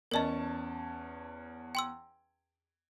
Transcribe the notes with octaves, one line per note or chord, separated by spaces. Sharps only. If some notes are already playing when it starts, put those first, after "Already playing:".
E2 C#4 A#4 D5 D#5 A5
G5 C6 E6